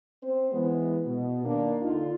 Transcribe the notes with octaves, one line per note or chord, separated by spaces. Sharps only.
C4 C5
E3 G#3 B3
B2
D#2 A#3 D4
D3 D#4 F4